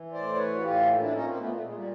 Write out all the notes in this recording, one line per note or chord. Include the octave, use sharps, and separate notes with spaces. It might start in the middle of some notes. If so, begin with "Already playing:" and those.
Already playing: E3
A2 C5 D5
E3 B4 C#5
F#4
A2 F4 G4
A#2
D4 E4
A#2 C#4 D#4
A#3 C4
A#2 A3 B3
A3
A#2 G#3
G3